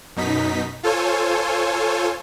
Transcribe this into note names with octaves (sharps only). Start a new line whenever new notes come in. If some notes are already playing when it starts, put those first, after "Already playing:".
F#2 B2 D#4 B6
F4 A4 C5 C#5 G#5